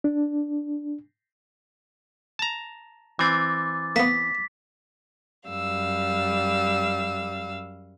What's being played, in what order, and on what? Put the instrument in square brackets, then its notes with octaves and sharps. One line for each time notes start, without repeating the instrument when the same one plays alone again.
[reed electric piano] D4
[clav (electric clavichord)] A5 A#5
[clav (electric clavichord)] E3 C4 [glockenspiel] D6 A6
[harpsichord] A#3 B3 [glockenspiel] B6
[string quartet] F#2 G3 F5 E6